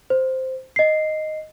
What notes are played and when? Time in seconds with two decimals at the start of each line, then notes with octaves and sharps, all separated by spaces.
0.10 C5
0.76 D#5 C7